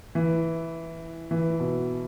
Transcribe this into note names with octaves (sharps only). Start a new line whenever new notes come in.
E3
E3
B2